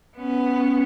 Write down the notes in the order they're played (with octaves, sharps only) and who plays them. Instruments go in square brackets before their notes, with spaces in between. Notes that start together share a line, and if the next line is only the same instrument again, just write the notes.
[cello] B3 C#4